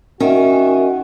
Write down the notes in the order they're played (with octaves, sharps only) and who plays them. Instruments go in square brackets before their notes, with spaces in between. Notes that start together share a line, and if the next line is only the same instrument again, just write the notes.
[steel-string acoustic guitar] D#3 [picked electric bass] C#4 [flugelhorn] F#4 [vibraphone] E5 G#5